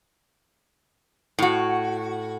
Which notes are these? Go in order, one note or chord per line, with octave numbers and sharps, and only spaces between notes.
A2 F#4